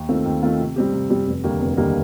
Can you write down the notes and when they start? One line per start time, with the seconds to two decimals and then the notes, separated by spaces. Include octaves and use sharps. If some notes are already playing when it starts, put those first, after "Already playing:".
Already playing: D#2
0.09 D#3 A3 C4 F4
0.26 D#2
0.42 D#3 A3 C4 F4
0.60 C3
0.76 G3 C4 G4
0.93 C3
1.10 G3 C4 G4
1.27 F1
1.44 D#2 D3 G3 A#3
1.61 F1
1.77 D#2 D3 G3 A#3